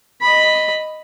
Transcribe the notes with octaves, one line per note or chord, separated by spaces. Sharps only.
D#5 B5